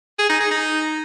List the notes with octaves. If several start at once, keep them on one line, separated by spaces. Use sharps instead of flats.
G#4
D#4
G#4
D#4